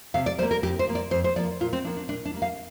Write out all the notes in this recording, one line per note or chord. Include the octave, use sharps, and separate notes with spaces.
C3 F5
D5
G3 A#3 C5
A#4
F2 G4
C5
F3 A#3
D5
F2 C5
C5
F3 A#3 D5
A#2 F4
C4
F3 A#3 D4
D4
A#2 D4
D4
G3 A#3
F5